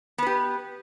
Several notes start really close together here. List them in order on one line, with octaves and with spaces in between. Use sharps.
B3 B4 G4